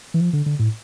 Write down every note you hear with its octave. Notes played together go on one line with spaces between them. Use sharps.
E3
F3
D3
D3
A2